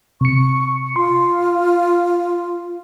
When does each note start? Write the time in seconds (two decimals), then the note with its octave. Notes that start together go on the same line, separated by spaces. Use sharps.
0.21 C3 C#6 C#7
0.96 F4 C6